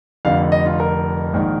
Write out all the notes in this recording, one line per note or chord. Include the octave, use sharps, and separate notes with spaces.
F1 F2 D3 F5
D#5
F4
A#4
A#1 G#2 D#3